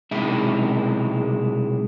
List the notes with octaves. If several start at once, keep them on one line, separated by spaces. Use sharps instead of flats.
B1 C3 G#3 D#4 E4 E5